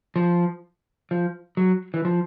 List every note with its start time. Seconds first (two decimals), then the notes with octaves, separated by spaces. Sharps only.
0.16 F3
1.11 F3
1.57 F#3
1.94 E3
2.05 F3